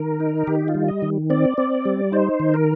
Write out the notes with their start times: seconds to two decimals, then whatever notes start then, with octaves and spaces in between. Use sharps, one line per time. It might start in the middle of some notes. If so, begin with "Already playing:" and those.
Already playing: D#3 A#4
0.20 D#4
0.47 D#3 G4
0.68 F4
0.75 G3
0.88 D#5
1.02 D#3
1.30 C4 D5
1.58 C4
1.85 G3
2.12 D#4 C5
2.40 D#3
2.54 A#4